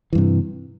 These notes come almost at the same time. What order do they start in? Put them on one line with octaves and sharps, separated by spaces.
E3 G2 C3